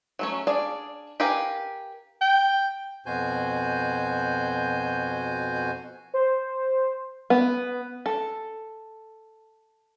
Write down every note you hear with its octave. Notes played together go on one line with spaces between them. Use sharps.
F#3 A3 C#4
D4 G#4 D5 F5
G4 A#4 B4 F5 G#5
G5
F2 B2 F#4 C5 G#5 G6
C5
B3
A4